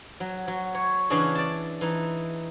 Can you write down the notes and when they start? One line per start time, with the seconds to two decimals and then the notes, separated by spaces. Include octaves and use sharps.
0.20 F#3
0.48 F#3
0.75 C#5
1.10 C#3 E3 C#4 D4 G#4
1.35 D5 A5
1.81 E3 D#4